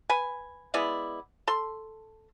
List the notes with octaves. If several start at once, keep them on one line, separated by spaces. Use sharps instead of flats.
B4 G#5
G#3 B3 E4 D5
A4 C6